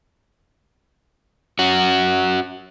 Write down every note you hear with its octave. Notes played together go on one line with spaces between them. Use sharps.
C#4 F#4